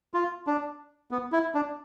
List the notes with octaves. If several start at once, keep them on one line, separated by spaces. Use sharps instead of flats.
F4
D4
B3
E4
D4